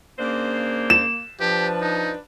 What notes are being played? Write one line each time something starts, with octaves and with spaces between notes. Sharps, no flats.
C#3 A#3 D4 C5
E7
F3 D4 G4 B4
D#4